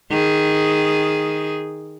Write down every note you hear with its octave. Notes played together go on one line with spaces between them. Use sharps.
D#3 G#4